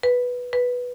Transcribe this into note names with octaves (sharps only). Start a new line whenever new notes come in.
B4
B4